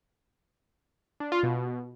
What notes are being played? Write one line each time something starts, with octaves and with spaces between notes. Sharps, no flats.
D4
F4
B2